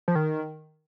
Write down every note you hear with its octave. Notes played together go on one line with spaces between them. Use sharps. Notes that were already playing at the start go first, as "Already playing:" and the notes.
F3
D#3